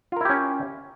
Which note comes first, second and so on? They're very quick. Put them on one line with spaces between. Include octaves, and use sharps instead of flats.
F4 A#4 E4 G4 C#4